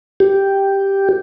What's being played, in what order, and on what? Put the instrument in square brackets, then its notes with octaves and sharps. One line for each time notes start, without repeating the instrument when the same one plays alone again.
[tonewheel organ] G4